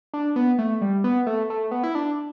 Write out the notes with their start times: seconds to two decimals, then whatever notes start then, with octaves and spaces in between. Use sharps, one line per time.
0.14 D4
0.36 B3
0.59 A3
0.81 G3
1.04 B3
1.27 A3
1.50 A3
1.71 B3
1.83 E4
1.95 D4